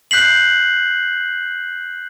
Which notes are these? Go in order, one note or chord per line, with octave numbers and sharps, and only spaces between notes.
F#6 G6 B6 C7 F#7